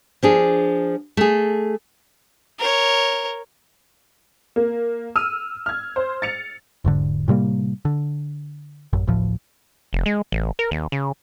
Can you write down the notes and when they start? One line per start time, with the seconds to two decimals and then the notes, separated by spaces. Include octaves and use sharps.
0.23 F3 D4 G#4
1.17 A3 G#4
2.59 A#4 C#5
4.56 A#3
5.16 E6 F6 D#7
5.66 F6 G#6
5.96 C5
6.22 A6 C#7 F7
6.84 E1 G#2 D3
7.28 A2 C3 G3 A#3
7.85 D3
8.93 A1 F#2
9.07 A1 D2 A2 F3
9.93 F1
10.06 G#3
10.32 A1
10.59 A#4
10.71 D#2
10.92 C#3